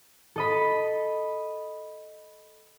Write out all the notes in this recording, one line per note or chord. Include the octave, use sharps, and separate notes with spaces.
A4 D#5 B5